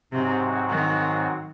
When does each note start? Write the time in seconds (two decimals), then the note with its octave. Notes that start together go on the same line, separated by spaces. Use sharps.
0.13 G#2 C3 F#3 C4 F#4
0.70 D#3